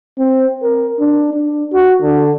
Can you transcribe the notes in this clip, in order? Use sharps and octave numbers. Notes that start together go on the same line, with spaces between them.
C4
A#4
D4
D4
F#4
D3